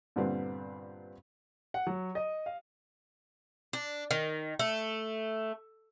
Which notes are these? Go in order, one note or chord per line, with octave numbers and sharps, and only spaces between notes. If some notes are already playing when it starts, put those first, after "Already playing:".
G2 A#2 D3 G3 B3 C4
F#5
F#3
D#5
F5
D4
D#3
A3